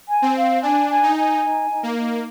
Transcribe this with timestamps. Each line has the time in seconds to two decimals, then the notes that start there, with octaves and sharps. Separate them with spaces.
0.08 G#5
0.22 C4
0.35 F5
0.62 D4 G#5
0.89 G#5
1.03 D#4
1.15 G#5
1.42 D#4
1.70 D#4
1.83 A#3
1.96 D#4